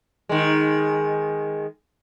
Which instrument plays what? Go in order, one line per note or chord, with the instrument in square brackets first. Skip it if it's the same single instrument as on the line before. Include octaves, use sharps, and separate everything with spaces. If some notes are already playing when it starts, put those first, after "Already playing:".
[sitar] D#3 G#3